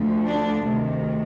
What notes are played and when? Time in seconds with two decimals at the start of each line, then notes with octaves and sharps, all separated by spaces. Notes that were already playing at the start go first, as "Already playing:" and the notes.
Already playing: D2 D3 F3
0.27 D4
0.66 D2 C3 D#3